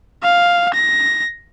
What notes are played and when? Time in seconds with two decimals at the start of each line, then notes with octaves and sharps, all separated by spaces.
0.23 F5
0.74 A#6